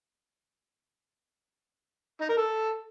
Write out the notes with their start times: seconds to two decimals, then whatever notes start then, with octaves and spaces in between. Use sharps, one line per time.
2.21 D#4
2.29 A#4
2.37 A4